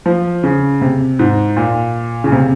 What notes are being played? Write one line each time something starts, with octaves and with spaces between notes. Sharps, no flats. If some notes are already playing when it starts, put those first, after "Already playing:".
F3
C#3
C3
G#2
A#2
C#3
C3